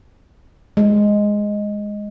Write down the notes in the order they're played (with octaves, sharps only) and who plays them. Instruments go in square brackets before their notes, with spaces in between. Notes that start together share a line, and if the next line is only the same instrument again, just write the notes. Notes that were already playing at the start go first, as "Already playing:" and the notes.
[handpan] G#3